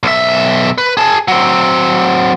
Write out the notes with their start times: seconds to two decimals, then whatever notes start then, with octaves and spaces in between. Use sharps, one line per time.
0.03 B1 E5
0.78 B4
0.97 G#4 A5
1.28 F#3 C4